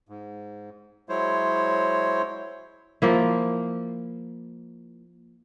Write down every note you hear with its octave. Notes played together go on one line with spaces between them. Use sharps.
G#2
F#3 G#3 E4 C5 C#5
F3 A#3 E4